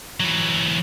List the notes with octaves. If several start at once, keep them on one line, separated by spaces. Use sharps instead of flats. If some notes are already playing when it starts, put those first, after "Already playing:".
E3 F#3